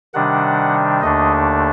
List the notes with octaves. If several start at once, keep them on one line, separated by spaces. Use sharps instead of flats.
C3 D#3 G3 D4 F#5
D#2 D3 A3 D4 D#5